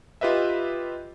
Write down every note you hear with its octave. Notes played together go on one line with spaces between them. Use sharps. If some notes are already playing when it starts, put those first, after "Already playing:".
F4 G4 B4 D#5 E5